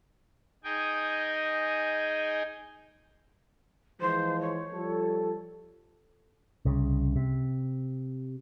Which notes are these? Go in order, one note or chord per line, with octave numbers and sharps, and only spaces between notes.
D#4 G#4 D#5 G5 G#5
E3 F3 G#3 C5
C#5
F3 G3 A4
C2 C#3
C3